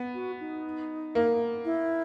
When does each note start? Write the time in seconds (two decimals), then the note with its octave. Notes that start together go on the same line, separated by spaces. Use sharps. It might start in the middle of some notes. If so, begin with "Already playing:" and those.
Already playing: B3
0.14 F#4
0.40 D#4
1.15 A#3
1.65 E4